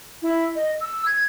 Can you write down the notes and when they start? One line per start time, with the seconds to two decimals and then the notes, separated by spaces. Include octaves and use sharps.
0.22 E4
0.56 D#5
0.81 E6
1.06 G#6